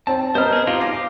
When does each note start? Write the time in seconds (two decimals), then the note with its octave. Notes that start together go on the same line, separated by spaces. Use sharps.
0.07 C4 A5
0.35 B3 A#4 C5 D#5 F6
0.53 G#4 C5
0.67 D#4 F4 G4 F5
0.80 F5 D6 A#6